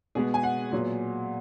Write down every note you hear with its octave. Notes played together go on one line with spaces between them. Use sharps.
B2 G#3 B3 G#4
G#5
F#5
A#2 F#3 B3